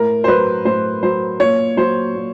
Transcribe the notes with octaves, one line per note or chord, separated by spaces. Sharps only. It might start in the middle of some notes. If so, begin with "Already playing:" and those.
Already playing: A2 A#4
C5
F#3 B4
A2 C5
F#3 C5
A#2 C#5
F#3 C5
A#2